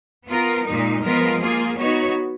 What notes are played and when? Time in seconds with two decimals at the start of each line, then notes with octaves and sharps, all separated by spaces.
0.27 B3 F4 A#4
0.65 A#2 G#3 D#4
1.02 F3 G#3 B3 F4 A#4
1.40 A#3 F4 G#4
1.77 B3 D#4 F#4 C#5